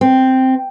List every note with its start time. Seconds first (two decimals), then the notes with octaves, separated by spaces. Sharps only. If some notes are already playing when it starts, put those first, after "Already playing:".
0.01 C4